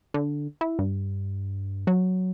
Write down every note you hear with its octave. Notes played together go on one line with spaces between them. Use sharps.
D3
E4
G2
F#3